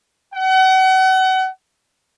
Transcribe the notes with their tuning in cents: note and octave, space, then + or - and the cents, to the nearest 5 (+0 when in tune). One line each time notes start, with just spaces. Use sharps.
F#5 +35